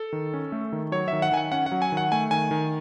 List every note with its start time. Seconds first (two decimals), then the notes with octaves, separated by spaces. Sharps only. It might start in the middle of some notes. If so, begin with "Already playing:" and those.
Already playing: A4
0.13 D#3
0.34 C#4
0.52 A3
0.72 D#3
0.92 F#3 C#5
1.08 D#3 E5
1.22 F#5
1.31 D#3 G#5
1.37 F#5
1.52 C#4 F#5
1.66 F#5
1.72 F#3
1.82 G#5
1.92 D#3
1.97 F#5
2.12 A3 G#5
2.31 D#3 G#5
2.51 D#3